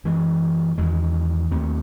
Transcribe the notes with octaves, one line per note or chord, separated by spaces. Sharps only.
F#2 E3 G#3
E2 D#3 G#3
D#2 D#3 A3 C4